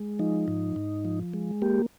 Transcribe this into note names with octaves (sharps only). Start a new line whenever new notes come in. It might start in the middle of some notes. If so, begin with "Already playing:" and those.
Already playing: G#3
F3 D#4
G#2
G#2
F3
G#3
A#3 G4